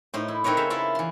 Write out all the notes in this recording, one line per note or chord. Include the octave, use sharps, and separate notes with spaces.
A2 D#4 C5
E4
C4 D#4 A#4 B4 C#5
C#3 A4 E5 F5
E4 F4 A#4 E5
E3 C6